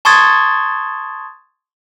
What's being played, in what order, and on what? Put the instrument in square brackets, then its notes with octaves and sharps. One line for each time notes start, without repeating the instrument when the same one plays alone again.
[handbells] A5 C6 C#6 D#6 G#6 A6